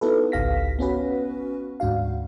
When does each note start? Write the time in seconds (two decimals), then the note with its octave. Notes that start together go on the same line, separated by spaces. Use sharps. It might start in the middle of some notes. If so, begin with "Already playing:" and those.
0.01 B3 D#4 E4 F#4 A4 B4
0.32 G#1 C#2 G4 F5 A#6 B6
0.79 B3 C#4 F#4 B4
1.80 D2 G#2 D4 F#4 F5